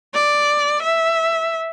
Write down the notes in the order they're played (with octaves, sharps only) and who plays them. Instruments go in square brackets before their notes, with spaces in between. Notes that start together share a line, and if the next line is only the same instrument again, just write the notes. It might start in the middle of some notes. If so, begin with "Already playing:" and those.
[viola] D5
E5